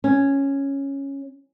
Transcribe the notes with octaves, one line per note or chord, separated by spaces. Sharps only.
C#4